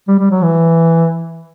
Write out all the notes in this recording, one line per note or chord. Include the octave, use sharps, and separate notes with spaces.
G3
G3
F#3
E3